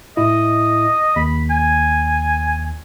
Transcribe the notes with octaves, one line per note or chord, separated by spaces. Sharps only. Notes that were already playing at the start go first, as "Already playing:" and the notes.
A2 E4 D#5
D#2 B5
G#5